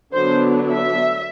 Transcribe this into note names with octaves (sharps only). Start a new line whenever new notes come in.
D3 F#3 B3 D4 C5
E5